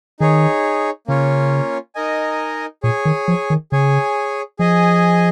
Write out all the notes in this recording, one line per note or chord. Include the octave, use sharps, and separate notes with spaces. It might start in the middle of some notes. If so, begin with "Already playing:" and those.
D#3 D#4 G#4 C#5
C#3 A#3 C#4 F4 C#5
D#4 A#4 D#5 G#5
A#2 G#4 C#5 G#5
D#3
F3
D#3
C#3 G#4 C#5 G#5
F3 G#4 D#5 G#5